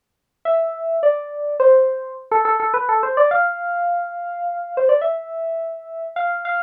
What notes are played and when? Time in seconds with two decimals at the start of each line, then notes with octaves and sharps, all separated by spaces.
0.45 E5
1.03 D5
1.60 C5
2.32 A4
2.45 A4
2.60 A4
2.74 B4
2.89 A4
3.03 C5
3.17 D5
3.31 F5
4.77 C5
4.89 D5
5.02 E5
6.16 F5
6.45 F5